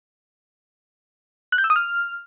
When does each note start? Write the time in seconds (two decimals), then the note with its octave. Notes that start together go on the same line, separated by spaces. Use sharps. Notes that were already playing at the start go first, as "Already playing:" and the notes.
1.52 F#6
1.58 G6
1.64 E6
1.70 D#6
1.76 F6